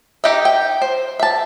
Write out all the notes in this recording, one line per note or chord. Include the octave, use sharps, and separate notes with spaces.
D#4 G4 D#5 E5
G5
C5
E5 A5